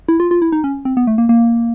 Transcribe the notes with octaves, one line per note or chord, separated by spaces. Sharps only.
E4
F4
F4
E4
D#4
C#4
C4
B3
A3
A#3
A#3